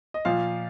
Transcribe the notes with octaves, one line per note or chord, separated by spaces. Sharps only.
D#5
A#2 F3 F5